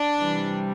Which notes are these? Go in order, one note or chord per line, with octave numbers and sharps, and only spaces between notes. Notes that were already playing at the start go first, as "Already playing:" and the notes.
Already playing: D4
C3 E3 G3